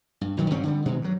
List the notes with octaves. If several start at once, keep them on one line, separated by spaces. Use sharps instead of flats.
G2
B1 B2 D#3 F#3
G2 C#3 C4 C#4
D3 G3
B2 D#3 E3 G#3
G2 F#3